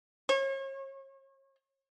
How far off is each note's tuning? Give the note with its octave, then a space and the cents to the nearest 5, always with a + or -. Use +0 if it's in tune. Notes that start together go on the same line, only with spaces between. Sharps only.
C#5 -40